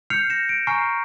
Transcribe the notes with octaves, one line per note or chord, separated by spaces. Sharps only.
F6 G6 C7 C#7 F7
A#6 C#7 E7
D7
G#5 A#5 C#6 F6 C7